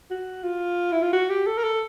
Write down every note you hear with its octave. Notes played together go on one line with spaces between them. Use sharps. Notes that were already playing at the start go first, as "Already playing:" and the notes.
F#4
F4
E4
F4
F#4
G4
A4
A#4
A4